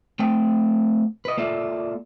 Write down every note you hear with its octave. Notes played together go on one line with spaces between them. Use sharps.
A3 C4 G5
B4 D#5
A#3 F4 A4 D5 E5